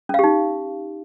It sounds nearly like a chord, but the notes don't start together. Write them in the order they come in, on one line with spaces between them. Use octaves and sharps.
C#4 F5 G4 D#4